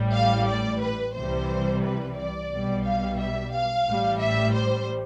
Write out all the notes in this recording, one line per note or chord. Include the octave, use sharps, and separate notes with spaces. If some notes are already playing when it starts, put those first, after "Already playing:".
Already playing: A1 A2 G3
F5
D5
B4
C2 C3 E3 G3 C5
B4
D5
B1 B2 G3
F5
E5
F5
A1 A2 G3
E5
C5